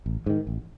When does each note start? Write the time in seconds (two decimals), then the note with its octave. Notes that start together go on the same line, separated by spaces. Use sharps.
0.06 A1
0.26 G#2 D#3
0.47 A1